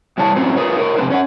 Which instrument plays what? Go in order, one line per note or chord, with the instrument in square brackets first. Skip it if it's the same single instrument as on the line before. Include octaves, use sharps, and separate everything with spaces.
[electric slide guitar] E2 E3 G3 C#5 A5
A2 F#3 C4 C#4
F4 G#4 A#4 B4 C#5
D#4 A#4 C#5
F2 C3 A#3 B4 C5
C#4 C#5 F#5